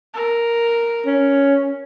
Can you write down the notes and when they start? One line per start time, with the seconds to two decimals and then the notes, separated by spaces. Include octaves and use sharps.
0.14 A#4
1.06 C#4